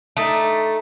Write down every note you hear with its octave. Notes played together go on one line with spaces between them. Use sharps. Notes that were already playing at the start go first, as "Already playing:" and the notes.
A3 D#4 D5 D#5